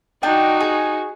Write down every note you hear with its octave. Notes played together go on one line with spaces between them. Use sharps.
D4 D#4 F#4 G5
G#4